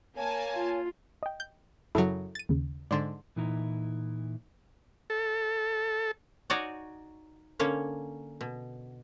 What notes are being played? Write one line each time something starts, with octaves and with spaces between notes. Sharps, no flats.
A#3 C#5 G#5 A5
F4
D#5 G5
G6
F#2 C#3 F#3 E4 A4
A6 D#7
D#2 C#3
G#2 D3 D5 C6 A6
A#2 E3 D#4 E4 A5 A#5
A4
D#4 F#4 C#5 D5 F#5 G#5
D3 A#3 C#4 C#5
B2